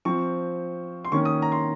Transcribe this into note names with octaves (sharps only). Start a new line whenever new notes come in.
F3 C4 C#6
C6
D#3 A#3 C#4 C#6
D#6
A#5
C6